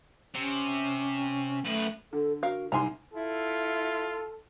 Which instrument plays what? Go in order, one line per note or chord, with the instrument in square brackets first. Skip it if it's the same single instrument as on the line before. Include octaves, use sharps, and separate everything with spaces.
[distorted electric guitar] C3 [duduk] C#4
[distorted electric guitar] F#2 B4 [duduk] A3
[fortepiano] D3 [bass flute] A4
[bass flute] F#4 [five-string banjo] A#4 F5
[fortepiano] C2 C6 [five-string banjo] F#3 G#5 A#5 [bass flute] D#4
[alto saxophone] E4 [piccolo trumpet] F4 [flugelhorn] A4